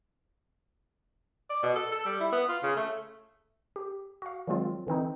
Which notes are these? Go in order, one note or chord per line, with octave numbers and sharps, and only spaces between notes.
D5
B2
A4
A4
G3
E4
B3
F4
C#3
A3
G4
F#4 F5
D#3 F3 F#3 G#3 C4 F4
D3 E3 C4 D#4